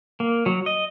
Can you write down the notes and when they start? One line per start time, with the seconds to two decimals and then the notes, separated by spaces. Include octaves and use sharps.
0.20 A#3
0.46 F#3
0.66 D#5